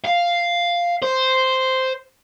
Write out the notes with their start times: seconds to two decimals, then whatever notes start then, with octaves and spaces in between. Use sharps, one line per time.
0.05 F5
1.03 C5